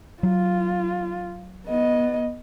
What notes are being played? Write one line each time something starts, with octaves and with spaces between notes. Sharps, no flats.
F#3 F4
B3 D#5